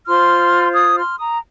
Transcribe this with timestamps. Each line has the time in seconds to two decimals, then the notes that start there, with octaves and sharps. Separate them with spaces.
0.06 F4 C5 C6 F6
0.74 D#6 G#6
0.96 C6 F6
1.18 A#5 D#6